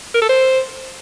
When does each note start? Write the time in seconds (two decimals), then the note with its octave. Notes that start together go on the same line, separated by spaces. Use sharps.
0.14 A#4
0.22 A4
0.29 C5